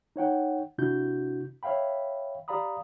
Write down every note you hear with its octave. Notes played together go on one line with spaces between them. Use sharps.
D#4 C#5 F#5 G5
C3 D4 E4 F#4 G6
C#5 E5 F5 G5 B5
G4 D5 F5 A#5 B5 D#6